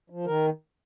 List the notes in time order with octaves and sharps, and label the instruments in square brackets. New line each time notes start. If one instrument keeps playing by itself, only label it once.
[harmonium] F3
D#3 A#4